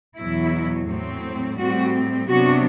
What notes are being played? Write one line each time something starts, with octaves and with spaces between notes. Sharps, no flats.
E2 B2 F#3 E4
A2 F#3 C4
A2 G3 C4 F#4
C3 F#3 B3 D4 F#4